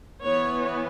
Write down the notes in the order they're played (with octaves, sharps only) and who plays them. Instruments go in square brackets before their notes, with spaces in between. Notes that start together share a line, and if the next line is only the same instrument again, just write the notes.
[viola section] E3 B3 C#5